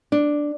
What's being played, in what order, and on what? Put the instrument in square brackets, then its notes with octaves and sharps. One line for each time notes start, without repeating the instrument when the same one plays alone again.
[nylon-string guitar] D4